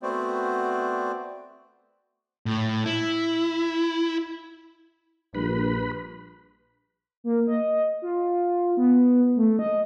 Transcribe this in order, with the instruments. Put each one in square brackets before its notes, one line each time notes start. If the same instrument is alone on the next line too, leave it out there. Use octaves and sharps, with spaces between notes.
[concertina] A3 B3 C4 F#4 C5 D5
[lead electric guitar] A2
E4
[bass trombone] A#1 [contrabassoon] G2 [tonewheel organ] B4 B5
[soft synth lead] A#3
D#5
F4
B3
A3
D#5